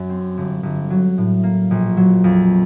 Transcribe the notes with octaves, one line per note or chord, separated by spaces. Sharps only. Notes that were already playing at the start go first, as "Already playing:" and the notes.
Already playing: F#2
C4
G1
G1
F#3
A2
A#3
A#1
F#3
F2